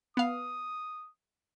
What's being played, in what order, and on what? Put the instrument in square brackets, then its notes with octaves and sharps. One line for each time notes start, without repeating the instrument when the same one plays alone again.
[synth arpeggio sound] B3 F5 [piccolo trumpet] D#6